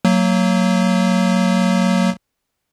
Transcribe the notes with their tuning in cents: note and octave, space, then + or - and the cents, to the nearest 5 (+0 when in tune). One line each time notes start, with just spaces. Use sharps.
F#3 +0 A#3 -30